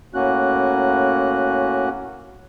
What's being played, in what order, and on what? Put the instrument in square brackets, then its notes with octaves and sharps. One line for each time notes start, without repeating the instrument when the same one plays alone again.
[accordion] A2 A#3 C#4 F#4 F#6